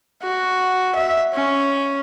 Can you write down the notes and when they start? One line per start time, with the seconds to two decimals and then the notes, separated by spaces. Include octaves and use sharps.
0.22 F#4
0.95 E5
1.34 C#4